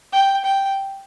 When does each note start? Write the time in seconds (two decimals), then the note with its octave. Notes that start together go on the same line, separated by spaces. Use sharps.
0.12 G5
0.45 G5